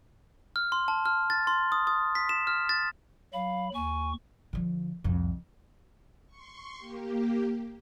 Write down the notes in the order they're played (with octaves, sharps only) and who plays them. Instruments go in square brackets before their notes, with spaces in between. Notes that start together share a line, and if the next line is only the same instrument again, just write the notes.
[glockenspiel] F6
C6
A5
F6
A6
C6
D#6
D#6
B6
E7
F6
A6
[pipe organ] F#3 B5 [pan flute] F5
[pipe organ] D#2 C#6 [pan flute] G#5
[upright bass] D3 F3
C2 F2
[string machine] C6 C#6
A#3 G4